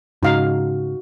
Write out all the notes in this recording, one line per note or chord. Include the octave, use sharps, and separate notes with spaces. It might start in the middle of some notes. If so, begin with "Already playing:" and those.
G#2 C#3 D#4 F#4 F5